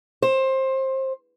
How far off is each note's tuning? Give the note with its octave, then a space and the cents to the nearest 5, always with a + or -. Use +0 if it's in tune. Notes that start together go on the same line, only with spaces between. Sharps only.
C5 +20